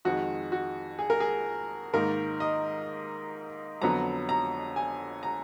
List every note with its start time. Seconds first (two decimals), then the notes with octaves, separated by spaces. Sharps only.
0.05 F2 D#3 G#3 F#4
0.52 F#4
0.99 G#4
1.10 A#4
1.20 G#4
1.93 G#2 D#3 A#3 A#4
2.40 D#5
3.82 F2 D3 F#3 B3 A#5
4.29 A#5
4.76 G#5
5.23 A#5